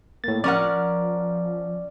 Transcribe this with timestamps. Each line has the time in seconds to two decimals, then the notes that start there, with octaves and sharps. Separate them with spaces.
0.24 A2 A#3 A6
0.44 F3 C#4 A#4 D5 F#5